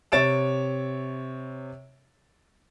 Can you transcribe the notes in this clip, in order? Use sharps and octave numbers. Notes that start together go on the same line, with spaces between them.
C3 C#5 A6 D7 E7